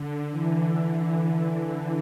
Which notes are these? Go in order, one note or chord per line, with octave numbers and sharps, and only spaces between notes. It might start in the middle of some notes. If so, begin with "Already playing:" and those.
Already playing: D3
E3